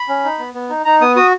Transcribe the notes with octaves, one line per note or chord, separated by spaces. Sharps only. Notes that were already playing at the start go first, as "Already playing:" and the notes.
Already playing: B5
C#4
D#4
B3
B3
D#4
D#4 A#5
B3 D#6
F#4 D#6